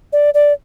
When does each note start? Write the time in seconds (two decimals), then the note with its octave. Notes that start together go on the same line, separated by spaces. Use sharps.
0.13 D5
0.34 D5